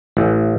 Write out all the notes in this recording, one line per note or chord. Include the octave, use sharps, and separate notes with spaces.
A1